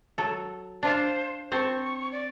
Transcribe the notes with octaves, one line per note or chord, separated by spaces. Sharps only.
F#3 A4
D4 F4 C5 F5
C4 C5 A5 C#6
D5